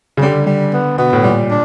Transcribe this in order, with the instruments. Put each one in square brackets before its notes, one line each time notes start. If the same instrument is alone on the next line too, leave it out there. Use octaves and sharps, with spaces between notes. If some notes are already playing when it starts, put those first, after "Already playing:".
[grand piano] C#3
[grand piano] D3 [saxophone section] G3
[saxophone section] G3
B3
[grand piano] B2 [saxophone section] B3
[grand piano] A2
[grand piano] A#2 [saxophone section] G3
[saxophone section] D4